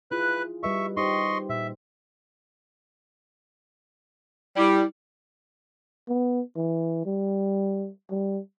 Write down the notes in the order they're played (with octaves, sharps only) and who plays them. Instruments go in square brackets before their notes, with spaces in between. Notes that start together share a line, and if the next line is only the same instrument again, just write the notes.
[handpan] E4 F4 G#4 [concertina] B4 F#6
[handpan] G3 B4 D#5 [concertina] E5 C#6
[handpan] D#4 G4 C5 [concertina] D#5 C6 C#6
[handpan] A#2 [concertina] E5
[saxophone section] G3 [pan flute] E4
[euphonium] B3
E3
G3
G3